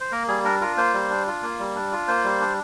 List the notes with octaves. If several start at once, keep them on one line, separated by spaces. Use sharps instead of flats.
C5
A#3 A#4
G3 G#4
D4 A#4
F4 A#4
A#3 C5
G3
D4
F4
A#3
G3
D4
F4
A#3 C5
G3
D4